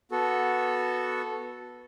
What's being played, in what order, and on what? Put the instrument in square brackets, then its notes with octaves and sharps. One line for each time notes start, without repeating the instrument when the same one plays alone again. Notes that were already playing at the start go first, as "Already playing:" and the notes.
[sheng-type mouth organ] B3 F#4 A4